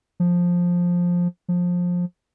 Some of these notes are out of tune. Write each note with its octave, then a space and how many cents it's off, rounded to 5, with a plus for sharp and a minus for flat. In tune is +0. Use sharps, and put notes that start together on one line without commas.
F3 +10
F3 +20